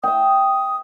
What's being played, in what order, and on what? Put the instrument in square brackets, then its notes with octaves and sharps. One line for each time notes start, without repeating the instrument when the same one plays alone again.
[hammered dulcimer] E5 G5 [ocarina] D#6